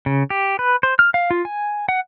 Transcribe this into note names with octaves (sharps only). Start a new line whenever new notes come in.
C#3
G4
B4
C5
F6
F5
F4
G#5
F#5